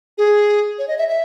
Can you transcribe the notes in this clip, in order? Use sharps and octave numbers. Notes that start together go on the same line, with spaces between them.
G#4
C#5
D#5
E5
E5